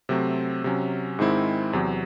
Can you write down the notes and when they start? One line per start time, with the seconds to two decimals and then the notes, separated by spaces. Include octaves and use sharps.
0.09 C3 F#3 A3 C4
0.64 C3 F#3 C#4
1.19 G#2 D#3 G#3 C4 E4
1.73 E2 C3 F#3